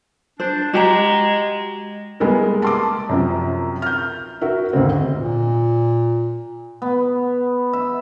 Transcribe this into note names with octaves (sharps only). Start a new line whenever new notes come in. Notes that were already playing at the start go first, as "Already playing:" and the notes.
D4 C5
G#3 F#4 G4 A#5
G3 G#3 A#3 B3 E4 A#4
A5 C6 D6
F#2 C3 F3
F6 G6
F#4 A#4 E5
D#2 G#2 D3 C4
A#2
B3
E5